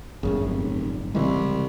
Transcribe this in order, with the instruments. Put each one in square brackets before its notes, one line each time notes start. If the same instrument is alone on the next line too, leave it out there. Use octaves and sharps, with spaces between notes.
[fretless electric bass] G1 F#2 A2 [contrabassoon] C#3
[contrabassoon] F1
[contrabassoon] C2 [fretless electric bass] C#3 E3 G#3